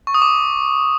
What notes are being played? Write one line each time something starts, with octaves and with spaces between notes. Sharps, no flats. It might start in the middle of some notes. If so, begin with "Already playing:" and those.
C#6
D#6
D6